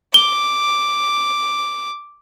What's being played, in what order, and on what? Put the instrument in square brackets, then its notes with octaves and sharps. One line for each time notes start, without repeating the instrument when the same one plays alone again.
[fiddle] D6 [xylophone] G7